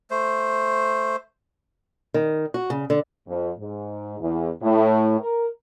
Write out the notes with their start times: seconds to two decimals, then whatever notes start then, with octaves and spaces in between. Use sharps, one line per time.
0.11 A3 C5
2.14 D#3
2.54 F#4
2.70 C#3
2.90 D3
3.28 F2
3.59 G#2
4.20 E2
4.63 A2
5.20 A#4